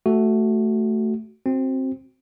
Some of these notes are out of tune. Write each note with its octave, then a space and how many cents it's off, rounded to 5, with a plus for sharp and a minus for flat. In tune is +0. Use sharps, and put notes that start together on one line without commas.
A3 +0 F#4 +10
C4 +10 F#4 +0